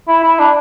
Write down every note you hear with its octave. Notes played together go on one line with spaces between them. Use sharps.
E4
E4
D4